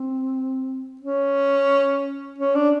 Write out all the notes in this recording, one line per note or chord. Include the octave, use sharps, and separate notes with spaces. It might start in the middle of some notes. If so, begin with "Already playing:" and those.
Already playing: C4
C#4
C#4
D4